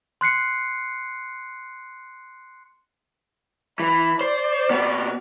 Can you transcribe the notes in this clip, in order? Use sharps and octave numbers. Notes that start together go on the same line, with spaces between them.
C6 F#6 C7 C#7
E3 B5
C5 D5
C3 B3